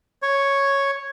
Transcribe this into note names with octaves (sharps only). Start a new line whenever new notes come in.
C#5